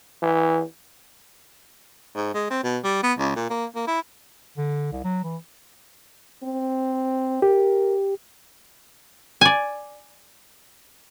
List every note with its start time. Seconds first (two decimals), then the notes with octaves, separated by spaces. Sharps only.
0.22 E3
2.15 G#2
2.34 G#3
2.50 C4
2.63 B2
2.84 G3
3.03 B3
3.18 C#2
3.36 A#2
3.50 A#3
3.75 A#3
3.87 E4
4.57 D3
4.92 C2
5.04 F#3
5.24 E3
6.43 C4
7.42 G4 A#4
9.41 D5 G#5